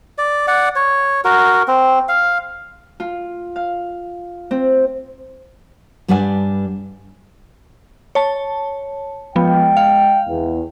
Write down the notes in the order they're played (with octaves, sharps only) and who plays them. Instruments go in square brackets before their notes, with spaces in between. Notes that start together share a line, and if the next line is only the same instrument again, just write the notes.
[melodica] D5
D5 F#5
C#5
F#4 A#4
C4
F5
[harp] F4
F5
C4
[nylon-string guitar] G2 G3 D4 B4 F#5 G#5
[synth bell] C#5 A5
[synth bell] F3 B3 [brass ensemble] G#3 D#5 G5
[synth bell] F5
[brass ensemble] E2